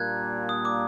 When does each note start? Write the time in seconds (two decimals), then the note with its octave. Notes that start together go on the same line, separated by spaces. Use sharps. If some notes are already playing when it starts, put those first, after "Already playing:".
Already playing: A#2 G3 A#3 D4 F#6 G#6
0.49 D#6
0.65 D6